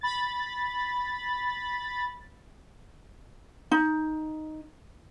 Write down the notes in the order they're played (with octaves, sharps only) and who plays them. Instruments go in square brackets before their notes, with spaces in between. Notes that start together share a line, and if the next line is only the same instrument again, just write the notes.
[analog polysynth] B5 A6
[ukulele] D#4